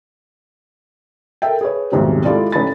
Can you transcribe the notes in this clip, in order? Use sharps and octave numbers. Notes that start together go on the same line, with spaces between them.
A4 A#4 E5 G5
G#4 B4 C#5
D#1 B1 F2 G#2 C3 G3
G#3 E4 F4 G4 A4 D5
A1 D#4 A4 B5 A6